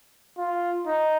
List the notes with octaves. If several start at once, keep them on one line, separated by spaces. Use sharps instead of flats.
F4
D#4